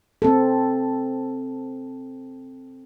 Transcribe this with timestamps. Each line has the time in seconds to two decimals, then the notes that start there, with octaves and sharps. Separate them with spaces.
0.22 C4 A4